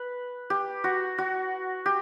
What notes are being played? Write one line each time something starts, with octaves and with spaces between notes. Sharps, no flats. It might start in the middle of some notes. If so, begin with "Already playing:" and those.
Already playing: B4
G4
F#4
F#4
G4